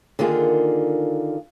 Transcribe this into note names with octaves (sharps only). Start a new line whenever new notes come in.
D3 D#3 A#3 F4 G#4